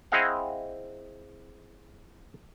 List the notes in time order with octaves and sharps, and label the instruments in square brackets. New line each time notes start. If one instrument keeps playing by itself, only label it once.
[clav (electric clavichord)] C4 E4 G#4 D#5 F5 F#5